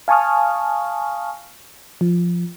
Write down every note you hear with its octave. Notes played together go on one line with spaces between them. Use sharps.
F5 G#5 A5 C#6 D#6 F6
F3